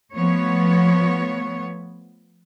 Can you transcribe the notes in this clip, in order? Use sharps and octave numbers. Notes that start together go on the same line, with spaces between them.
F3 A3 B3 C#5